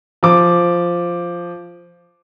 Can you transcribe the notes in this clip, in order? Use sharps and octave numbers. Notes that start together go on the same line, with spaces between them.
F3 D6